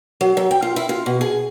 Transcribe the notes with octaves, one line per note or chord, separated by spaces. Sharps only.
F#3
F#3
G5
F4
E4
F4
B2
G#4